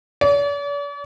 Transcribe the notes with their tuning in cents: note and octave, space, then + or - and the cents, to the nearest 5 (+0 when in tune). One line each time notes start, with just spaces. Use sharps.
D5 -45